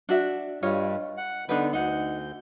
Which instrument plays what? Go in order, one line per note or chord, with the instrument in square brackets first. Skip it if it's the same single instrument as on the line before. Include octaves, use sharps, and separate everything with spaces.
[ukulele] D4 F#4 E5
[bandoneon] G2 G3 [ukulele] F4 C#5 D#5
[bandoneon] F#5
[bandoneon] D3 B3 [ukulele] D4 D#4 B4
[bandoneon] D2 G6 [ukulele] D#4 F#5